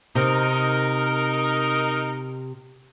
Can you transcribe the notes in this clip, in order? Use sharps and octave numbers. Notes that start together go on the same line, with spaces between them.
C3 D#4 A#4